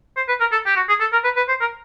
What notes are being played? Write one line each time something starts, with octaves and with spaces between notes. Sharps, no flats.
C5
B4
A#4
A4
G4
F#4
G#4
A4
A#4
B4
B4
C5
A#4